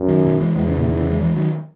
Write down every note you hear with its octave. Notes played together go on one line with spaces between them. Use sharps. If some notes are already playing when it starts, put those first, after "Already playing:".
Already playing: F#2
D#3 F#3
B2 D#3
E3 G#3
E2 E3 G#3
C#3 E3
A#2 C#3
B2 D#3
C#3 E3
E3 G#3
E3 G#3
D#3 F#3